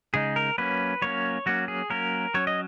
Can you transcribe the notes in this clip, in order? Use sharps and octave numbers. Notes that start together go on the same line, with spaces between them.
C#3 G#3 D#4 G#4
A#4
F#3 A#3 C#4 B4
F#3 A#3 C#4 C#5
F#3 A#3 C#4 F#4
G#4
F#3 A#3 C#4 A#4
F#3 C#4 C#5
D#5